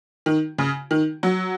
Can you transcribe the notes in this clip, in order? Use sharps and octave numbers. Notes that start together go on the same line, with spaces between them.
D#3
C#3
D#3
F#3